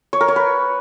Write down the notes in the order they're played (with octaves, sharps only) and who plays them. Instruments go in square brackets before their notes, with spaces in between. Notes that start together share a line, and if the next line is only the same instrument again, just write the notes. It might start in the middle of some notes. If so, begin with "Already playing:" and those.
[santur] C#5
A#4
C#5
B4